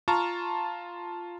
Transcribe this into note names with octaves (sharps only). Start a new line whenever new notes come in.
F4 A5 A#5 C#6 F6